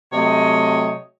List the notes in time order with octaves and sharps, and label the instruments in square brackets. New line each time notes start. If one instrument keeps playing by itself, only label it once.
[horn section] C3 F#3 A3 C#5 D#5 G5